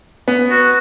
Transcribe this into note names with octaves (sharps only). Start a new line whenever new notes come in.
B3
F#4